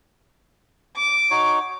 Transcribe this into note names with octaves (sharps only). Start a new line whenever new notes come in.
D6
D#4 F#4 C#5